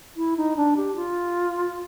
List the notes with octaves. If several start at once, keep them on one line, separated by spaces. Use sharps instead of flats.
E4
D#4
D4
G4
F4